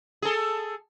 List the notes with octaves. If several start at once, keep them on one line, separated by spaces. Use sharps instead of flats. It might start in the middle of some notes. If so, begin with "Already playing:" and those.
G#4 A4